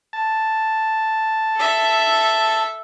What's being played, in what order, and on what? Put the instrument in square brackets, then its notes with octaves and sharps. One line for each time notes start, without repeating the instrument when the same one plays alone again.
[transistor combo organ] A5
[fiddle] A4 E5